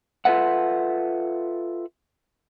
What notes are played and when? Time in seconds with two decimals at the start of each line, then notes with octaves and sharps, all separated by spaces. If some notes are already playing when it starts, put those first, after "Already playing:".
0.25 F4 A4 B4 E5 F#5